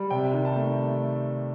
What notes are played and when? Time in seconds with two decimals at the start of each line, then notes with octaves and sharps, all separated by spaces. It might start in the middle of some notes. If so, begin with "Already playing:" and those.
Already playing: G3
0.10 C3 G5
0.34 D#3
0.45 A5
0.56 A3